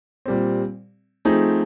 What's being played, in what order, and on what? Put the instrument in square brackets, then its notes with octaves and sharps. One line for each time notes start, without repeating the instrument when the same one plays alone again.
[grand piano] A#2 G3 C4
F3 A3 C4 D#4 G#4